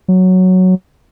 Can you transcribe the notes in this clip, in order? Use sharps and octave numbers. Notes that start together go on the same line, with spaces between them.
F#3